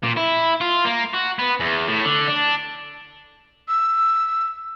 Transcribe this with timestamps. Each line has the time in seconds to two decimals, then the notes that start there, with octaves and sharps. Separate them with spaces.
0.03 A#2
0.17 E4
0.61 F4
0.85 A#3
1.14 F#4
1.39 B3
1.60 E2
1.87 A2
2.05 D3
2.28 D4
3.68 E6